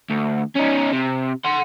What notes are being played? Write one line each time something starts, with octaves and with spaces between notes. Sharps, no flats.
D2
C#4 D#4
C3
F#5 C6